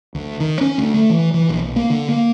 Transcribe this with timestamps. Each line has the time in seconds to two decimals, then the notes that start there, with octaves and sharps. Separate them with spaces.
0.15 D2
0.40 D#3
0.61 C#4
0.78 D2
0.94 A3
1.10 E3
1.34 E3
1.49 A#1
1.64 B1
1.76 A#3
1.90 D3
2.09 A#3